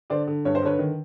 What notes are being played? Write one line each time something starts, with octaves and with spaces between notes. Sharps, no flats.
D3 C5 D5
D3
G2 C#5
C5
D3 B4 C#5
D#3